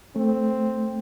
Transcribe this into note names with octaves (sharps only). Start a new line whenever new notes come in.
A3 C4